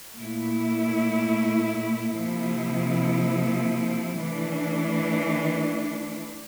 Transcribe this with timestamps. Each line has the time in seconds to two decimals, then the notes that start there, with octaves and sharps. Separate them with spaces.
0.17 A#2 A3 E4
2.18 C3 F3 A#3 E4
4.19 E3 A3 D4